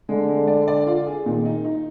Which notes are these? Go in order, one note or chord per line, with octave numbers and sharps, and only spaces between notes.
D3 G#3
G#3
D5
D5
F4
G#4
A#2 D#3
D#4
D#4